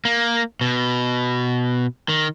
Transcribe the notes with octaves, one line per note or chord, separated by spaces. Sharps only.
A#3
B2
D#3